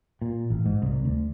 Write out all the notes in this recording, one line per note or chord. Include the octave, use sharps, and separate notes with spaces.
A#2
A1
G#2
C2
D2